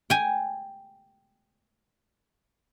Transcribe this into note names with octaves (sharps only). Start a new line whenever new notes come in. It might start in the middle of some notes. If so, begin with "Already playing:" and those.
G5 G#5